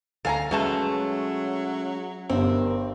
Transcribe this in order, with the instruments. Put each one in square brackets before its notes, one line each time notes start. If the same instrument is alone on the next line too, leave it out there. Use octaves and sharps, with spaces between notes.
[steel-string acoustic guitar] D2 C#3 F5 [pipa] A4 G#5 A#5
[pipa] B2 A3 A5 [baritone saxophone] F#3 [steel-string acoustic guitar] G#3 C#4
[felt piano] G1 G2 [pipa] C4 [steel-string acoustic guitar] A#4